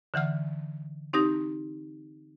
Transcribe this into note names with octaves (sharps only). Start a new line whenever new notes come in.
D3 E3 F#5 F6
C4 D#4 G4 D#6 A#6